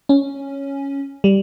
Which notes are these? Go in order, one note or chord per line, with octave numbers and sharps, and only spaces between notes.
C#4
G3